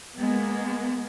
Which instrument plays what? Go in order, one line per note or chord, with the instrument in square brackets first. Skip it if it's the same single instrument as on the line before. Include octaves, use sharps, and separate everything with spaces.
[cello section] G#3 A#3 B3